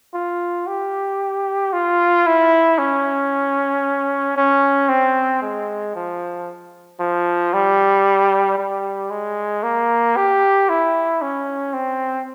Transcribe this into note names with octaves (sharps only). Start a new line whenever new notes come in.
F4
G4
F4
E4
C#4
C#4
C4
G#3
F3
F3
G3
G3
G#3
A#3
G4
E4
C#4
C4